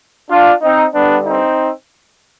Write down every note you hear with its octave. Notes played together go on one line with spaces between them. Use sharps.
D4 F4
C4 D#4
G2 D3 G3 B3 D4
C4 D#4